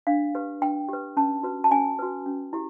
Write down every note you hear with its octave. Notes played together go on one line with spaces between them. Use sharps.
D4 F5
G4 B4
D4 G5
G4 B4
C#4 A5
F#4 B4
A5
C#4 G#5
F#4 B4
C#4
E4 G4